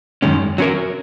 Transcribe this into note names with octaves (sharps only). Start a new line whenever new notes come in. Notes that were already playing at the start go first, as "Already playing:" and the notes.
F#2 D#3 G#3 C#4
F#3 C#4 A#4